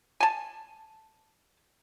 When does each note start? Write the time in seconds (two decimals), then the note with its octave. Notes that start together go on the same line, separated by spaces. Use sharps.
0.20 G#5 A5